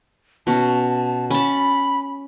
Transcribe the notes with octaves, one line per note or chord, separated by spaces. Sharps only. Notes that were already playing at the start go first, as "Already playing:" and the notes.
B2 C#4 A5
C#4 A5 B5